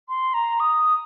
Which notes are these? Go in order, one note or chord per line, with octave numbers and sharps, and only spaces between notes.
C6
A#5
D#6